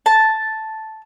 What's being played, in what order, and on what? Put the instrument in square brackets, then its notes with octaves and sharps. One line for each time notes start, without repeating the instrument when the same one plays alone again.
[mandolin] A5